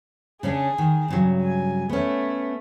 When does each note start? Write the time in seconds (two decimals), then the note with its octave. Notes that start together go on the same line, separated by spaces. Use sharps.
0.43 C#3 C#4 D4 G#4
0.78 D#3
1.08 G2 C#3 F#3
1.42 G#5
1.89 A3 B3 C#4